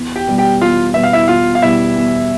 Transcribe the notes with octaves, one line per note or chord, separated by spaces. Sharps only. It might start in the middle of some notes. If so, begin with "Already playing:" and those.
Already playing: E2
G4 G5
B2 G3 B3
G4 G5
E2 F4 F5
B2 G3 B3 E5
F5
E4 E5
E2 F4 F5
F5
B2 G3 B3 E4 E5
E2